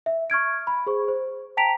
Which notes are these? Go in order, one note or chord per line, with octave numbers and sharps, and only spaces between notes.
E5
C#6 F6 G#6 D7
B5
G#4 C5 C#6
C5
G5 A5 A#5 B6 D7 F7